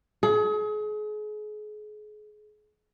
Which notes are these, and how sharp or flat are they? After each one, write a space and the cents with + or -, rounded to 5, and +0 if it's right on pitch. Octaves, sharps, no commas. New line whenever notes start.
G#4 +35